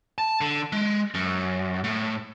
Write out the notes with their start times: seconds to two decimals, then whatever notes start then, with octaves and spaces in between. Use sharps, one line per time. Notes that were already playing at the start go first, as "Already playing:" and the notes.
0.18 A5
0.41 D3
0.73 G#3
1.14 F#2
1.84 A2